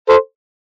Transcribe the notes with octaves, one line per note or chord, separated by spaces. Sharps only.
A4 C5